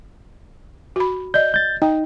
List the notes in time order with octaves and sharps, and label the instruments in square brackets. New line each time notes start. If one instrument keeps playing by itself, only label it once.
[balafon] F#4 B5
[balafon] D5 D#5 [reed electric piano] G6
[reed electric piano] G6 A6
[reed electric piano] D#4 [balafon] G5